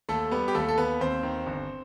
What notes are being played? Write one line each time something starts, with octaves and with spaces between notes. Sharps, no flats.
D#2 A3 A4
G3 B3 B4
G4
D#2 A3 A4
A4
D#2 B3 B4
D#2 C4 C5
D#3
G1